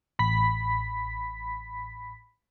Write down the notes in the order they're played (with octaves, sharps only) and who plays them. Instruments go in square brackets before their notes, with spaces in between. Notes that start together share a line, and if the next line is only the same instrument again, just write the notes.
[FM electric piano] A1 B5 B6